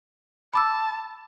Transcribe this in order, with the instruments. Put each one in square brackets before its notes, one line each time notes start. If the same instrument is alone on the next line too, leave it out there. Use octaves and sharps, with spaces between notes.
[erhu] A5 [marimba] B5 D6 E6